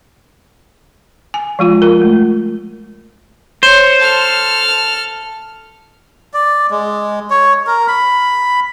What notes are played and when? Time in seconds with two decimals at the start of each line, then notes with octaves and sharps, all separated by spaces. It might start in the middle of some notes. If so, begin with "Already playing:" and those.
1.34 G#5
1.59 F3 G#3 F4
1.82 F4 A#4
2.02 A3
3.63 C5 C#5
4.00 A4 F6
6.34 D5
6.70 G#3
7.30 C#5
7.67 A#4
7.88 B5